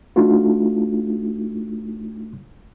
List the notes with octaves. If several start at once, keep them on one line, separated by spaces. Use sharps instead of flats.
A3 D4 D#4 F4 F#4